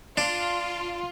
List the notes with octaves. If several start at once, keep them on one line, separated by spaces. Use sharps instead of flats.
D4 F4